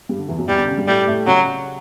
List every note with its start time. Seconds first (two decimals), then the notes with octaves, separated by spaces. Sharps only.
0.09 G2 G3
0.19 D3
0.28 E2 E3
0.38 F#2 F#3
0.48 E2 E3 G3
0.58 D3
0.67 C#3
0.77 G2 G3
0.87 A2 G3 A3
1.07 A2 A3
1.26 C#3 F#3 C#4